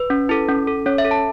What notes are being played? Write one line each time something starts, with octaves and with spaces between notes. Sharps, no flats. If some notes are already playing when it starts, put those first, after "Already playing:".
Already playing: B4
C#4
E4 A4
C#4
A4
C#4 C#5
E5
A4
A5